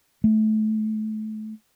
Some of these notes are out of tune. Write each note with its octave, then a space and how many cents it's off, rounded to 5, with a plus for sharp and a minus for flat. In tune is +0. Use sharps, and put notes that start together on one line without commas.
A3 -25